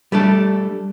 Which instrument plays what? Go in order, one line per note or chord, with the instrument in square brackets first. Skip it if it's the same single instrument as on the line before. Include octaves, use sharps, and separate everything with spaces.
[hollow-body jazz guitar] G3 A3 D4 A4